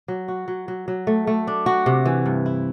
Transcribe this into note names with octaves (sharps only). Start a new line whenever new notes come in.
F#3
F#4
F#3
F#3
F#3
A3
A3
D4
F#4
C3
E3
G2
E4